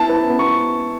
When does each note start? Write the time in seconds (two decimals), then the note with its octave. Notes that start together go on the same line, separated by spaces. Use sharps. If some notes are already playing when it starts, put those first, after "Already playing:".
Already playing: B3 E4 A5
0.09 B4
0.30 B3
0.39 C#6